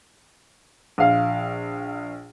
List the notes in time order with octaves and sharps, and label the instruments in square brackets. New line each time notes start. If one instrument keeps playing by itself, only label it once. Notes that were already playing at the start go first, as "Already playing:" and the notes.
[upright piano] A#1 F5